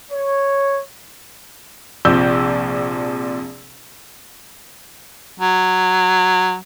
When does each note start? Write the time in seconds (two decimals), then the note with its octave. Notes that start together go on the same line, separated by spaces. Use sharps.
0.12 C#5
2.05 A#1 C3 F3 E6 G6
5.40 F#3